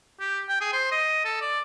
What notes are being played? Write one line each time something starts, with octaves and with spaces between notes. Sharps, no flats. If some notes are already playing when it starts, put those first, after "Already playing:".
G4
G5
G#4
C5
D#5
A4
D5